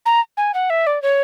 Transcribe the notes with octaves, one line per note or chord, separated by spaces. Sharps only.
A#5
G#5
F#5
E5
D5
C#5